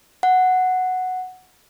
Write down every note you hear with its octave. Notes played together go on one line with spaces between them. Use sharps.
F#5